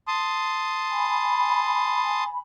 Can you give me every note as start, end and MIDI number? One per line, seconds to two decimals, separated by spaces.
0.08 2.24 81
0.08 2.24 84
0.08 2.24 87
0.90 2.40 80
0.90 2.40 83